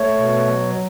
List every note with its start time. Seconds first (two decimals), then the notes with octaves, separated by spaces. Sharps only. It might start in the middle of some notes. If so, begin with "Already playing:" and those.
Already playing: A3 C#5
0.17 B2
0.46 F#3